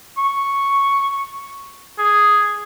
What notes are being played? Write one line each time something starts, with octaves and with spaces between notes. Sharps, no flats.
C#6
G#4